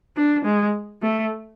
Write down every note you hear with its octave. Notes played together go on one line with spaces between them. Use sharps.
D4
G#3
A3